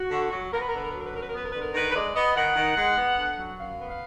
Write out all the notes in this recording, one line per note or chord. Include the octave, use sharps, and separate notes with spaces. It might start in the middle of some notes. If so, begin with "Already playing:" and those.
Already playing: F#4
D3
F#3
B3 A#4
B4
A#4
D3 B4
A#4
B4
F#3 A#4
B4
F#2 A#4
B4
A#4
B3 B4
A#4
B4
D3 A#4
D#3 B4
B4
G#3 D5
B3 D#5
D#3 F#5
D#3
G#3
B3
D3
F#3
F#2 F5
B3
F5